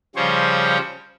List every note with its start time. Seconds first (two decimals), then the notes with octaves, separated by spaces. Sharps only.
0.16 C#3 F3 G3 C5 C#5